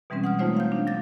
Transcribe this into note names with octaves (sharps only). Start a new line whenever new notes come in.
B2 E3 G3 G#3 C4 C#4
F#5 D#6 F6
A3 A#3 D#4 F4 C5 C#5
F5 G6
D4
F#3 D6 A6